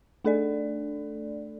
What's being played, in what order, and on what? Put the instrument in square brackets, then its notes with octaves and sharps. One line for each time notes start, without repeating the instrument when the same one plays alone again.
[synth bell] A3 D4 A4 D5